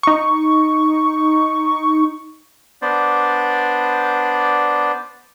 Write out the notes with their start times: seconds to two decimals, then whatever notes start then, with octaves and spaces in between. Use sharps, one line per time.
0.03 D#4 C#6
2.82 B3 D4 C5 D5